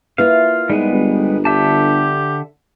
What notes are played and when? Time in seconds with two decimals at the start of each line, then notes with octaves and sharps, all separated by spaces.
0.18 A#3 E4 F4 B4 F5
0.70 G#2 G3 G#3 B3
0.93 G1
1.45 D3 G4 E5 A5